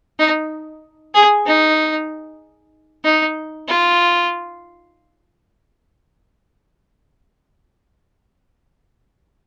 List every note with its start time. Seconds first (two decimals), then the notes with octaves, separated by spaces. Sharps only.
0.19 D#4
1.14 G#4
1.46 D#4
3.04 D#4
3.68 F4